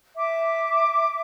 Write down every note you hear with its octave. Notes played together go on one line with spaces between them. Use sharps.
E5 D6